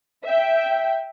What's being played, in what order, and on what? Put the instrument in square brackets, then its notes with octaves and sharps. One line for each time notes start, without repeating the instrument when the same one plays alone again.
[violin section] E5 G5